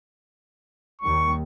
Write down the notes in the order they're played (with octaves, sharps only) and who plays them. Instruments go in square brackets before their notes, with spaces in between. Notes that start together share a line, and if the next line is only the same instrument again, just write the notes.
[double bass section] D#2 D#3 G3 [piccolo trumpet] C#6